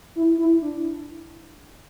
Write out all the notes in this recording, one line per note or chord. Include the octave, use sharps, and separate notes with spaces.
E4
E4
D4